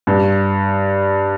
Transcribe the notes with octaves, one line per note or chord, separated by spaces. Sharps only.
G2